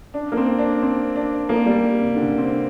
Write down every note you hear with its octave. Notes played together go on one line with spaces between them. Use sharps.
D4
A#3
C4
D4
C4
D4
A#3
G3
C3
D3
C4